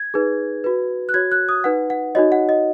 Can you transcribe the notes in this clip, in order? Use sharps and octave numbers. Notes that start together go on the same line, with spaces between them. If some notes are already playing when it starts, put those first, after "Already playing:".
Already playing: G#6
D#4 G#4 B4
F#4 B4
F#6
F#4 C#5 G#6
F#6
D#6
D#4 B4 F#5
F#5
D#4 F#4 C#5 D#5
F#5
D#5